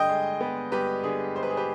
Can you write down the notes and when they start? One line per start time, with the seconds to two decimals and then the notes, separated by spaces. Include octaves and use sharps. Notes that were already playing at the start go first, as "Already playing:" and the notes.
Already playing: G2 D3 D#5 G5
0.09 G#3
0.41 B3
0.72 G2 G4 B4
1.04 D3 G#4
1.35 G#3 C5
1.43 B4
1.50 G#4
1.57 G4 B4